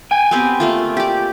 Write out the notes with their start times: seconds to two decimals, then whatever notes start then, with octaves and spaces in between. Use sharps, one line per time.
0.11 G5 G#5
0.31 B3 C4 G4
0.60 A3 A#3 F4
0.97 G4 D5